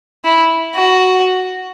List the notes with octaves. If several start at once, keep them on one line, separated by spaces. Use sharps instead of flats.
E4
F#4